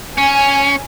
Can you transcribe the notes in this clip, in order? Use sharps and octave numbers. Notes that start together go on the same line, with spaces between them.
C#4 G#5